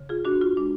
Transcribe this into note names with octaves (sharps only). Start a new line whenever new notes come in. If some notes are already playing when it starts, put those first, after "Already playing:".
Already playing: C#3
F4 G#4
F2 D4 F#4
F4
G#3 D4